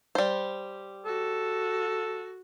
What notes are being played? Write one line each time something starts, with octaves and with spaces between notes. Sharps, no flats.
G3 C5
F#4 A4